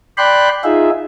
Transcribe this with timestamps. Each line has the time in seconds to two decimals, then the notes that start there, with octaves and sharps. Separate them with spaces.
0.17 D5 G5 B5 C6 F#6
0.64 D#4 F4 G#4 E5